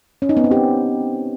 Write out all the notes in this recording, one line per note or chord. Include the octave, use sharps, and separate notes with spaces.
C#4
D#4
B3
C4
G4